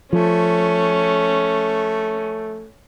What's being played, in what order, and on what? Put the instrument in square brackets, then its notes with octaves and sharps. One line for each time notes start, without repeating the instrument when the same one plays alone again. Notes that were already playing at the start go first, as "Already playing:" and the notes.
[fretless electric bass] F3 [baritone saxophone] A3 [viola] C#4